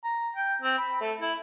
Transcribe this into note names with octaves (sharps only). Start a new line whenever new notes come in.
A#5
G5
C4
B5
A3
E4